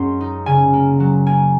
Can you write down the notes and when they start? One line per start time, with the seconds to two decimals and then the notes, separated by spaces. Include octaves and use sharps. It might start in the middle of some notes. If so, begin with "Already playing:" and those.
Already playing: F#2 G#3 C6
0.21 D#4
0.46 C#3 G#5
0.73 A#3
1.00 F#3
1.26 A#3 G#5